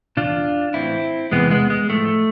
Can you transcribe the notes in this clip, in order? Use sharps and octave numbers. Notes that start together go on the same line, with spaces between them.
E2 B2 D4 F4
A2 E3 C4 E4
E2 C3 E3 G#3 B3
G#3 B3
G#3
A2 F3 A3